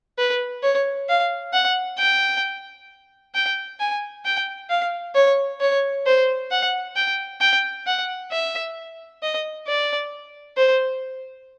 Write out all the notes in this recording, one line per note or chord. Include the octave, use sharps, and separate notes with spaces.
B4
C#5
F5
F#5
G5
G5
G#5
G5
F5
C#5
C#5
C5
F#5
G5
G5
F#5
E5
D#5
D5
C5